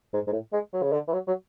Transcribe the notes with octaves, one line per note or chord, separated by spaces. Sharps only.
G#2
G#2
A2
G#3
F#3
C#3
D3
E3
F#3
F#3